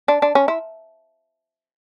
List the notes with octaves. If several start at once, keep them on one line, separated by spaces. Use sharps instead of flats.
D4
D4
C#4
E4